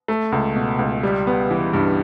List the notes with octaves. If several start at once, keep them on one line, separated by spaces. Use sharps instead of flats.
A3
C#2
B2
C#2
G3
B3
E3
G2